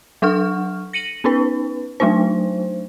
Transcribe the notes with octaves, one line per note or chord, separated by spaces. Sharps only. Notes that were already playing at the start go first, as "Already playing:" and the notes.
F#3 D4 A4 F#5 C#6 F6
A#6 C#7 D#7 F#7
B3 C#4 D#4 B4
F#3 A3 D4 D#4 C5